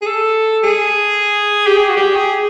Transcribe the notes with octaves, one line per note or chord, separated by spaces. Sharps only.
G#4
A4
G#4
G4
G#4
F#4
G4
G#4